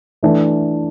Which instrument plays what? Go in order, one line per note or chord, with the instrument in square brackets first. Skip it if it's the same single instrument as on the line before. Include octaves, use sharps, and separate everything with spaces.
[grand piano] E3 A3 D4